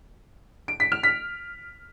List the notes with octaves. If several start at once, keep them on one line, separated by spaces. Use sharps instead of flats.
D7
B6
F6
B6